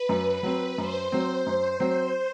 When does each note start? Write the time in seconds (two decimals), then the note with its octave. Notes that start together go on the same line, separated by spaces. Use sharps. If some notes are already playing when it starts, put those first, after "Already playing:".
Already playing: B4
0.09 F#2
0.43 F#3 C4
0.78 F#2 C5
1.12 F#3 C4
1.46 F#2
1.80 F#3 C4